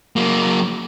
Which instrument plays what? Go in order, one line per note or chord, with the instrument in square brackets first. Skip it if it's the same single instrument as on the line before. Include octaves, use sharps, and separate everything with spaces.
[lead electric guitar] F#3 A#3